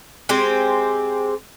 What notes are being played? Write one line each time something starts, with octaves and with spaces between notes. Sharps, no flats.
G#3 C4 G4 G#5